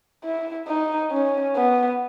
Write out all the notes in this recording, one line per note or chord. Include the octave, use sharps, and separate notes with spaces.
E4
D#4
C#4
B3